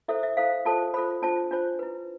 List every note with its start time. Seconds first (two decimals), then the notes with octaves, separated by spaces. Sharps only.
0.08 E4 A4 C5 E5
0.23 E5
0.37 E4 A4 C5 F5
0.65 F4 A4 C5 A5
0.94 F4 A4 C5 B5
1.22 D4 F4 C5 A5
1.51 D4 F4 C5
1.79 E4 B4